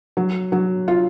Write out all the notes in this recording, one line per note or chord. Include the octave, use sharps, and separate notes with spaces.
F#3
F#3
F4